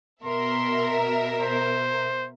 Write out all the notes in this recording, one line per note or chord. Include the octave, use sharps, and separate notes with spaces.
B2 A#4 E5 C6
C5